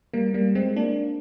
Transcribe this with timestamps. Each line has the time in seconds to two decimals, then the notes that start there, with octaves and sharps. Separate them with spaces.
0.14 G3 A#3
0.34 G3 A#3
0.55 G#3 C4
0.76 A#3 D4